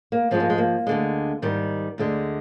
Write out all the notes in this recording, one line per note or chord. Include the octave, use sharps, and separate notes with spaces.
A#3
G#2 F3 G#3 C4
A#3
G#3
A#3
D2 D3 G#3
G#2 D#3 G3
D2 D3 G#3